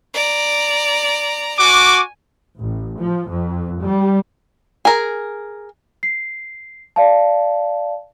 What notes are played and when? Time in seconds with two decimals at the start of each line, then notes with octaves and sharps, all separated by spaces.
0.14 D5 A#5
1.59 F#4 G#5 D6
2.59 A1
2.99 F3
3.29 F2
3.82 G3
4.85 G#4 A#4
6.03 C7
6.96 D5 F5 A5